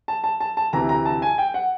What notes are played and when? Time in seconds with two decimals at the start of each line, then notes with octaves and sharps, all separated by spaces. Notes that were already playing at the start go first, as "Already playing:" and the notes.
0.08 A5
0.24 A5
0.40 A5
0.57 A5
0.73 D2 C3 E3 A#5
0.89 A#5
1.06 A5
1.22 G#5
1.38 G5
1.54 F#5